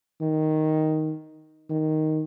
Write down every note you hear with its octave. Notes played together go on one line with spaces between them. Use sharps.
D#3
D#3